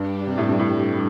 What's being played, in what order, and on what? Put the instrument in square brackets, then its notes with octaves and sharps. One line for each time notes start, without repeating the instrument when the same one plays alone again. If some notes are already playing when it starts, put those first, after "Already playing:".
Already playing: [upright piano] G2 [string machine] G3 D4 G4
[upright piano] C3
A2
G2
A2